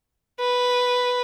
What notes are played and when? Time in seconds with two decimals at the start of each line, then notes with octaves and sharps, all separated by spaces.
0.40 B4